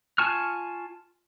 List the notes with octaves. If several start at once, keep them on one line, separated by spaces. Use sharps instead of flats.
F4 G#5 A5 C#6 F6